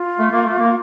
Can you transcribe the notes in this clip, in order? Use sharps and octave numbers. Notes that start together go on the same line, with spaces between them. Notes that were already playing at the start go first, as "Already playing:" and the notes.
Already playing: F4
A3
A#3
A3
A#3